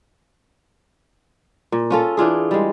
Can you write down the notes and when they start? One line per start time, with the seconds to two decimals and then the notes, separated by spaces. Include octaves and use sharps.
1.72 A#2
1.90 C#4 F4 A4
2.17 E3 D4 F4 G#4
2.51 G3 G#3